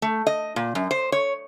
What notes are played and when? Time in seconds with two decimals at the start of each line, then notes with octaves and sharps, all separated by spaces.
0.02 A3
0.27 D#5
0.56 A#2
0.75 F#2
0.91 C5
1.12 C#5